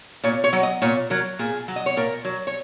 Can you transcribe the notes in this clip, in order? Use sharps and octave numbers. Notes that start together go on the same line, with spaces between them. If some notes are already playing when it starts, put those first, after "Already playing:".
A#2 C#5
C#5
F#3
D#5
A#2 C#5
F#3 A#4
A#2 G#4
F#3
D#5
C#5
A#2 A#4
F#3
C#5